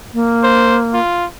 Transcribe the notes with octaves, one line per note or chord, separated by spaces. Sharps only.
A#3
C5
F4